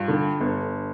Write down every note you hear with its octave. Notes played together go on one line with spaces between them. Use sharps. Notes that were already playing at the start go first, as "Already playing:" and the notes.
Already playing: G2 F4
D3
G1